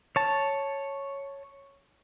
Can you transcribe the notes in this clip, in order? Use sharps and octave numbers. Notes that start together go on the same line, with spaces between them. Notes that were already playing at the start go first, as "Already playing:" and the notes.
C#5 A5